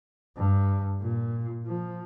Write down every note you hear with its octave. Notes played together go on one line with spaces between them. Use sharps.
G2
A#2
F3